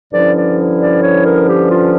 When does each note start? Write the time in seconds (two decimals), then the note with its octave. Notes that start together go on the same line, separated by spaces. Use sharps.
0.12 G2 D3 F3 C#4 E4 D5
0.35 D5
0.79 D5
1.02 C#5
1.24 A#4
1.47 G4
1.69 F4